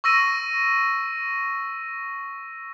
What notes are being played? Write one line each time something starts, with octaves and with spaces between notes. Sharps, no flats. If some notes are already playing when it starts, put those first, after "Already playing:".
C#6 E6 A#6 D#7